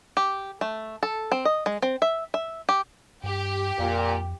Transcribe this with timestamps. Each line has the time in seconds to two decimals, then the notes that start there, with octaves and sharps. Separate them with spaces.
0.17 G4
0.61 A3
1.03 A4
1.32 C4
1.45 D#5
1.66 G#3
1.82 C4
2.02 E5
2.34 E5
2.69 G4
3.24 G2 G4
3.79 F2 A#2